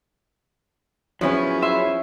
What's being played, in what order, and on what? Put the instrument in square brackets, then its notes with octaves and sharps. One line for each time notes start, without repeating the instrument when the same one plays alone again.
[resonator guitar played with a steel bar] F3 B3 [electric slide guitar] F#3 E4 G#4 [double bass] C#4
[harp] E5 C6